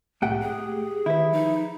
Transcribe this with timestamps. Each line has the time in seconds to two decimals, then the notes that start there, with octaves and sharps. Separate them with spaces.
0.22 C2 A2 A3 G4 F#5 G5
0.42 G4 G#4
1.06 D#3 E4 B4
1.33 F3 D#4